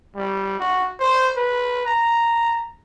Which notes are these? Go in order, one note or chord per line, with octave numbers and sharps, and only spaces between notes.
G3
F#4
C5
B4
A#5